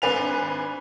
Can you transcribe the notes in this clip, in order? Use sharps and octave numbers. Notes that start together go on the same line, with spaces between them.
G#1 D4 B4 G#5 F7